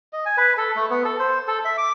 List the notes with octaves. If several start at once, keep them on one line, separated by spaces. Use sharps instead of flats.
D#5
G#5
B4
A4
A3
B3
A4
C5
A4
E5
D6